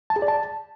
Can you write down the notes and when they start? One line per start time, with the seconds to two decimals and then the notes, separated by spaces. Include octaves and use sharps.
0.10 A5
0.16 G#4
0.22 D5
0.28 A5